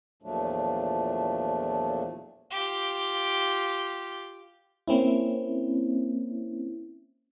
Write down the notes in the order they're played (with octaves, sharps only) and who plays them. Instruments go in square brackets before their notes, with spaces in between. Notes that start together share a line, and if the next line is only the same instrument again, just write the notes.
[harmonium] E2 A#2 F3 F#3 A3 D4
[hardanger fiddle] F4 G4
[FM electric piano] A#3 C4 C#4 E4